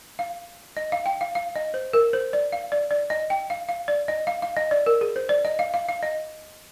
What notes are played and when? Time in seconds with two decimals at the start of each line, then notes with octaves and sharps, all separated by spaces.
0.19 F5
0.77 D#5
0.92 F5
1.06 G5
1.21 F5
1.35 F5
1.56 D#5
1.74 C5
1.93 A#4
2.13 C5
2.33 D5
2.52 F5
2.72 D5
2.91 D5
3.10 D#5
3.30 G5
3.50 F5
3.69 F5
3.88 D5
4.08 D#5
4.27 F5
4.42 F5
4.57 D#5
4.71 D5
4.86 A#4
5.01 G#4
5.16 C5
5.29 D5
5.45 D#5
5.59 F5
5.74 F5
5.88 F5
6.03 D#5